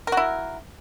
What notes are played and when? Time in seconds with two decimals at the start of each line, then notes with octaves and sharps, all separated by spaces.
0.07 A#4
0.12 F#4
0.17 E4